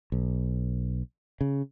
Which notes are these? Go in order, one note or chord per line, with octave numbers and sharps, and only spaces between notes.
B1
C#3